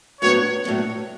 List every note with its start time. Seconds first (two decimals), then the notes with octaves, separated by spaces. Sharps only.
0.21 A2 F#3 B3 D4 C#5
0.64 A2 F#3 B3 D4